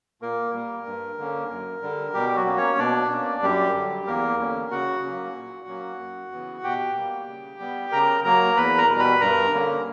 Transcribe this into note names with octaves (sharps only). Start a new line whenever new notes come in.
A#2 A#3 A#4
G3 A#3
G2
D3 A#3 C#4
F#2
D3 G3
B2 G3 G4
F#3 F#4
A#3 C#4
C#4 C#5
B2 D4 D5
A#3 C#4
F#2 G3 G4
D3 F#3
E2 A#3 A#4
D3 G3 A#3 C#4
C#3 F#4 F#5
F#3 A#3 C#4
A#2
F#3 A#3 C#4
F#2
C#3 E3 B3
B2 G4 G5
G3 A#3
C#3
G3 B3
C#3 A#4 A#5
F#3 A#3 A#4 A#5
E2 B4 B5
A#4 A#5
B2 G3
B4 B5
G2 A#4 A#5
D3 A#3 C#4